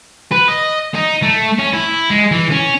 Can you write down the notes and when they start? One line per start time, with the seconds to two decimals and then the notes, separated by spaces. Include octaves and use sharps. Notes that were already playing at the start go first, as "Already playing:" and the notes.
0.32 B4
0.48 D#5
0.95 D#4
1.23 A3
1.59 C#4
1.73 E4
2.10 G#3
2.31 E3
2.51 C#4